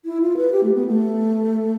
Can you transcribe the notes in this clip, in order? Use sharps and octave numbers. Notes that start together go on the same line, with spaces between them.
E4
F4
B4
G4
A3
B3
A3